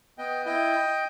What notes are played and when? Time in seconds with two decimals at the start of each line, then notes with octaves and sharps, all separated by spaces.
0.18 B3 D#5 G5
0.46 E4 D#5 G5